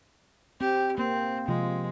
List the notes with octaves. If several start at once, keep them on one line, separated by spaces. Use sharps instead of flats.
C4 G4
A#3 C4
C3 F3 G#3 F4